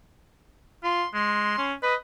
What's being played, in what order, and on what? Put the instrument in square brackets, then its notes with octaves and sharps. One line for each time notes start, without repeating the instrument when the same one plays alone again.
[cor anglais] F4 [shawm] C6
[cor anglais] G#3 [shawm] C6
[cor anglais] C#4
[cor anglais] B4 [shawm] D#5